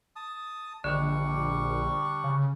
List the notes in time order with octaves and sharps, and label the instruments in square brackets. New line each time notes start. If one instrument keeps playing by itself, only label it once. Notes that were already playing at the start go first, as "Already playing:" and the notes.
[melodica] A5 D#6
[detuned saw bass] A#1 [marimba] D3 D#3 [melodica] G3 D4 C#6
[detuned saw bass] C#3